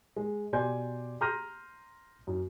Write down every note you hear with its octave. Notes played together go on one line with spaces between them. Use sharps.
G#3
B2 G4 D5 G#5 C6 G6
A#5 C6 F6 G6 A#6 D#7
F#2